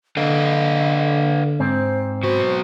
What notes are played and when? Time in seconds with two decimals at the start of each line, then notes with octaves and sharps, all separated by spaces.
0.17 D3 A4 B4 D#5 F5
1.60 G#2 C4 C5
2.23 F#3 F#4 B4 C5